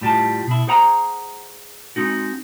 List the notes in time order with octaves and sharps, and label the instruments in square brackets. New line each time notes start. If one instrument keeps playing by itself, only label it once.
[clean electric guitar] A2 G3 F4 A5
B2 E4
G#4 C5 F#5 A#5
G#3 C4 D#4 F#4